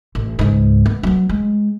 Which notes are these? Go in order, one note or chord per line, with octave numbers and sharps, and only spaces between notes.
A1
C#2 G#2
B3
F#3 B3
G#3